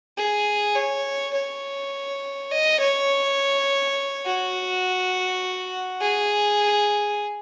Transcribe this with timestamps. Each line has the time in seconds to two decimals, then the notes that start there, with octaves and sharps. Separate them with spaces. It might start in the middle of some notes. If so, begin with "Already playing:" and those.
0.17 G#4
0.75 C#5
1.34 C#5
2.52 D#5
2.80 C#5
4.26 F#4
6.01 G#4